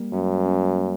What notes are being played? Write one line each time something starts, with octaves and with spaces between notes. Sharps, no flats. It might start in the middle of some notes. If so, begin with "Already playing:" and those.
Already playing: G3 A#3
F#2 C#4
C#4